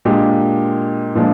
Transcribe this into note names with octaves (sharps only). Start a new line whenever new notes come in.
A#2 G#3 D4 G4
A#2 F3 G#3 D4